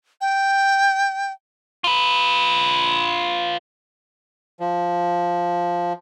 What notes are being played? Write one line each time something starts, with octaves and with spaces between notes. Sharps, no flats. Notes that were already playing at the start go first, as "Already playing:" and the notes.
G5
F4 B4
F3